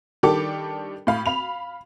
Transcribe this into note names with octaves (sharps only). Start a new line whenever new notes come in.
D#3 G3 D4 G4 A4 D6
A2 F5 B5
F5 B5 F7